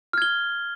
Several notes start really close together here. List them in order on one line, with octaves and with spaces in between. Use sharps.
F6 G#6 G7